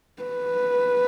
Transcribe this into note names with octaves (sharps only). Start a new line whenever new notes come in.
B4